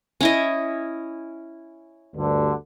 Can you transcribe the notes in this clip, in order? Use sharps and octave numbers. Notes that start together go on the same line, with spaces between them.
C#4 E4 D#5
D2 G2 D3